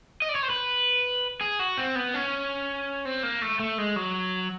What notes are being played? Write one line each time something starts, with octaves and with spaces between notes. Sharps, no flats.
D#5
D5
C#5
C5
B4
G#4
F#4
C4
B3
C#4
C4
A#3
A3
A3
G#3
F#3